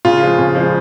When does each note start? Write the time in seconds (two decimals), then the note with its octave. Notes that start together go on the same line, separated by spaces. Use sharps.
0.05 C#3 F4
0.21 F3 G#3
0.39 C#3
0.55 F3 G#3